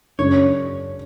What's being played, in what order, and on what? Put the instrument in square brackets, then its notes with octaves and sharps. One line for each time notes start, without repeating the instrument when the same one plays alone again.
[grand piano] F#1 F#2 C#3 G#3 D4 [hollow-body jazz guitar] C#5